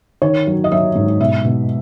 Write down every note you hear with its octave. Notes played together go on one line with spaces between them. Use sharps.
D#3 C#5
F#3
D#5
F#3 E5
G#2
B2 E5
B2